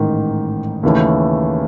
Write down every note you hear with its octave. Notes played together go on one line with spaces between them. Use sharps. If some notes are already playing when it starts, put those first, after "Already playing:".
Already playing: A1 G#2 D#3
D#2 C#3 E3 A3